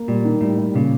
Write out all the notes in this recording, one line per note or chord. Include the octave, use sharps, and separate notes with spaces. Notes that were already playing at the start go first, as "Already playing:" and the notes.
Already playing: A#3
A#2 G3
D#3
A2 G3
G3
A#2 C#3